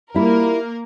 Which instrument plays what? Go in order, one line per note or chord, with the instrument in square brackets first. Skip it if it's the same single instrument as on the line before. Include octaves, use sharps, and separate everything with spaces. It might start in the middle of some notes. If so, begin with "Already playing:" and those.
[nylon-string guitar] G3 E4 F4 [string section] A#3 A#4